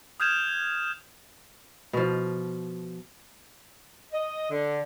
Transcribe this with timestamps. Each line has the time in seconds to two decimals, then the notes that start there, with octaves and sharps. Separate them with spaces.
0.20 D#6 F6 G6 G#6 E7 F7
1.93 B2 F3
4.13 D#5
4.51 D3